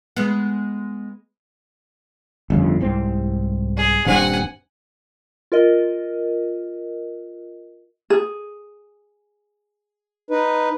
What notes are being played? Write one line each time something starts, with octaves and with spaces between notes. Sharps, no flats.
G#3 B3
G1 F2 C#3
C2 G#2 C4
G#4
D#1 G2 C4 F#5 G#5
F4 A#4 D#5
G#4
D#4 B4